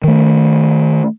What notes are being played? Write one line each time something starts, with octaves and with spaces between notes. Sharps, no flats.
D#3 A3